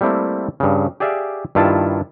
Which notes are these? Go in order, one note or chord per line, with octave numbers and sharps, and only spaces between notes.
G3 A3 A#3 C4 E4
G2 C#3
G4 G#4 D5 E5 F5
G2 D#3 E4 F4 A5